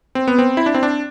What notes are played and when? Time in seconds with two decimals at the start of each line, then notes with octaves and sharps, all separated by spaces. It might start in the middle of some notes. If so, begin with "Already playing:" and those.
0.15 C4
0.28 B3
0.39 C4
0.57 E4
0.66 D4
0.74 C4
0.83 D4